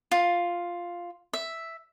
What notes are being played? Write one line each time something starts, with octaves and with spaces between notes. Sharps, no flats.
F4
E5